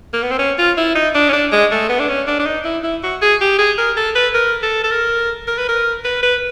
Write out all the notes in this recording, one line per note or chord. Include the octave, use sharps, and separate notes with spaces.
A#3
B3
C4
C#4
F4
E4
D#4
D4
C#4
D4
G#3
A3
B3
D4
C#4
D4
D4
D#4
E4
E4
F#4
G#4
G4
G#4
A#4
A4
B4
A#4
A4
A4
A#4
A#4
B4
A#4
B4
B4